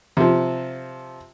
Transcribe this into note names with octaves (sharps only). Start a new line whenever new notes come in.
C3 F3